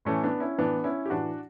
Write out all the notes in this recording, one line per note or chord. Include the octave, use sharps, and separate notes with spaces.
A2 E3 A3 C#4
B3 D4
C#4 E4
A2 E3 B3 D4
C#4 E4
G4
A2 E3 D4 F#4